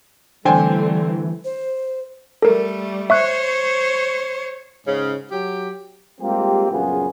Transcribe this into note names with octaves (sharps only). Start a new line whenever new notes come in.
D3 E3 G3 A3 C4 C5 G5 G#5
C5
G3 A3 A4 A#4
C5 C#5 E5 C#6 F#6
G#2 C#3
F#3 G4
G3 G#3 A#3 C4 F4 G4
A#1 F#2 C#3 B3 F4 G#4